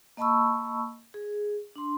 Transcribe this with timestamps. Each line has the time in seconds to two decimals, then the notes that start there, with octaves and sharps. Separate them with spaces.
0.17 A#3 D#5 A5 B5 C#6 E6
1.14 G#4
1.76 D4 C6